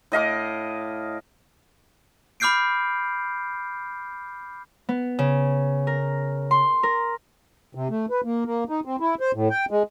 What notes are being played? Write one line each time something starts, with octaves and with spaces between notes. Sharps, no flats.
A2 D#5 F5 D6
B5 D6 F6 G6 C7 D7
B3
C#3
A#4
C6
A#4
C3
A3
B4
A#3
A#3
D#4
C4
E4
C5
A2
G5
G#3